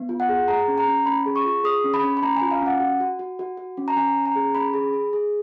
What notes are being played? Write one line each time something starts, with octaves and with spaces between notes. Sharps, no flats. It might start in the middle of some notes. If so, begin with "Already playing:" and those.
Already playing: B3
F4
F#5
G#4
G#4 A#5
C#4
A#5
C#4
C#4 B5
G#4
C#6
F4
G#4 D#6
C#4
B5
C#4
B5
C#4 A#5
G#5
F4
F5
C#4 F#5
F#4
F#4
F#4
F#4
F#4
C#4
A#5
C#4 G#5
C#4
A#5
G#4
C#4 B5
G#4
G#4
G#4